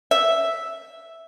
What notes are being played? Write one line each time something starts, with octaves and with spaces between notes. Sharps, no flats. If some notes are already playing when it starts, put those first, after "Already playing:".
E5